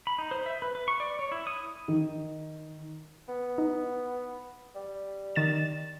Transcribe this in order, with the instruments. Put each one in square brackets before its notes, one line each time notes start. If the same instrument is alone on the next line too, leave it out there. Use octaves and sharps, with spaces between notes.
[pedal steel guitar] B5
D#4
C5
E5
B4
B4
C#6
D5
C#5
E4
D#6
[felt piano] D#3
[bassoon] B3
[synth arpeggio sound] D#4
[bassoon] G3
[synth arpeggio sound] D#3 A6 E7